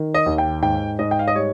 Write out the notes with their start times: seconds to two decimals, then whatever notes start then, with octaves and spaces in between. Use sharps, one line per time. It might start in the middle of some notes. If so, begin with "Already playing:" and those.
Already playing: D#3
0.14 D#5
0.26 D#2
0.38 G5
0.62 G#2 G5
0.99 G#2 D#5
1.11 G5
1.19 F5
1.28 D#5
1.35 G3 C#5